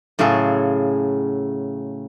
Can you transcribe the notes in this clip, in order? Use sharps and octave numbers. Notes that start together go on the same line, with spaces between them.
A2 C#3 F#3 F4 G#4 A4